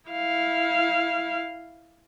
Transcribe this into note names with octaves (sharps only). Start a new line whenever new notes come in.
E4 F5